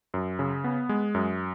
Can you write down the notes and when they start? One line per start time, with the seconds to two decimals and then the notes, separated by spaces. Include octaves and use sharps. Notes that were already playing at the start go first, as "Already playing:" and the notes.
0.14 F#2
0.39 C#3
0.64 B3
0.89 G#3
1.14 F#2